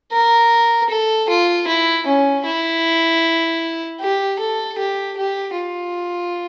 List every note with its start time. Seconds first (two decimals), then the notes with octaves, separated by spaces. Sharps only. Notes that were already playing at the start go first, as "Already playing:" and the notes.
0.12 A#4
0.89 A4
1.29 F4
1.68 E4
2.07 C#4
2.45 E4
4.01 G4
4.40 A4
4.79 G4
5.17 G4
5.57 F4